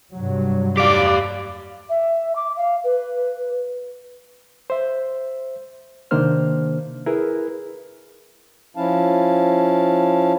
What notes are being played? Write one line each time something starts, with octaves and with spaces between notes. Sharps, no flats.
G2 C3 F#3
G4 D5 F5 D6
E5
D6
F5
B4
C5 E5
C3 D#3 A#3 D4 C5 F6
E4 G#4 A#4 B4
F3 C#4 E4 F5 A5